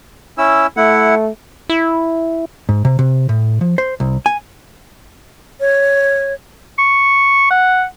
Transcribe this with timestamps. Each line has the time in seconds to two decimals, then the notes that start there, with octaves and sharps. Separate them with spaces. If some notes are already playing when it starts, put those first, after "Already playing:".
0.38 C#4 E4 E6
0.77 A3 E4 F#5
1.69 E4
2.69 G#2
2.85 C3
2.99 C3
3.29 A2
3.61 F3
3.78 C5
4.00 C2
4.26 G#5
5.61 C#5
6.78 C#6
7.50 F#5